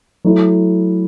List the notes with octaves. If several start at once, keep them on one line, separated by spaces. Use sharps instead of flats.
F#3 A3 E4